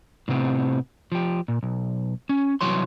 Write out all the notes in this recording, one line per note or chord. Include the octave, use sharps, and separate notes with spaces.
A2 C3 B3 C4
F3 G4
A#2
B1
C#4
C2 E3 F#3 C#5 C6